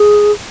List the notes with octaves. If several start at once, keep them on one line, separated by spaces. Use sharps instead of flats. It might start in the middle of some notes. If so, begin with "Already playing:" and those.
Already playing: G#4